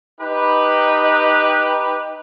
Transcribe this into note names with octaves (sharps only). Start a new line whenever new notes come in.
D#4 G4 B4